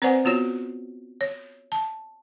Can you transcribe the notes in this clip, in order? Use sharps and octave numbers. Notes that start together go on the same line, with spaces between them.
C4 B4 C5 D5 F#5 G#5
B3 F4 F#4 C#5
C#5
A5